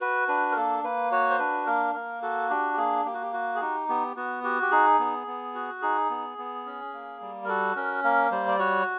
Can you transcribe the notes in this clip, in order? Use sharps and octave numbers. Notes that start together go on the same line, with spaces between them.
F#4 B4
D4 B4
A#4
A#3 A4
A#3 B4
F#4 C#5
C5
D4 B4
A#3 A#4
A#3 A#4
F#4 A4
D4 G4
G4
A#3 G#4
A#3 G4
F#4
G4
F#4
G#4
D#4 G4
B3 G4
B3 F#4
F#4 G4
G4
D#4 G#4
B3
B3
F#4
D#4 G#4
B3
B3
C#4
A#3
G3
A#4
F#4 A4
C#4 A#4
A#3 A#4
G3 C5
D5
F#4 C#5